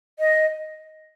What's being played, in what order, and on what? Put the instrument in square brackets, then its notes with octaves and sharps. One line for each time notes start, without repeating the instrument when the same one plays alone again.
[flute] D#5